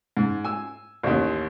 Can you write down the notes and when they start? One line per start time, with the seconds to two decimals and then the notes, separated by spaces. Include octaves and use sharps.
0.17 G#2
0.44 G#5 E6
1.03 A1 D#2